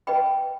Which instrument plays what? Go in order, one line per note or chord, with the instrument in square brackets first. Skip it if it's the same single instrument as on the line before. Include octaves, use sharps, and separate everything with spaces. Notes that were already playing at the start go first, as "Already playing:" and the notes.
[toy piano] B4 D#5 G5 B5